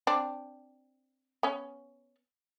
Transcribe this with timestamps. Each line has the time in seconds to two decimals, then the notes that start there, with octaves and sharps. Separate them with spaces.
0.07 C4 D4
1.43 B3 C#4